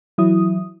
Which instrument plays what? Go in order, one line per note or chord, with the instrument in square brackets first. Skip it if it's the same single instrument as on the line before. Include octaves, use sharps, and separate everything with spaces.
[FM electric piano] E3 F#3 E4 D#6